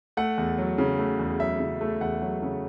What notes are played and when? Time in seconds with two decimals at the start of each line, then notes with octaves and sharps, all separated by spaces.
0.17 A3 F#5
0.38 E2
0.58 F#3
0.78 C#3
0.98 A3
1.19 E2
1.39 F#3 E5
1.60 C#3
1.81 A3
2.01 E2 F#5
2.22 F#3
2.42 C#3